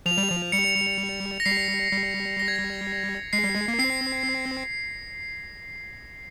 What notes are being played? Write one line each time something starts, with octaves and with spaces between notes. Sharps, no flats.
F3 F7
G3
F3
G3 C#7
A#6
G3 C7
G3
A#6
G#6
A#6
G#3 C7
G3
G#3
A#3
C4 C7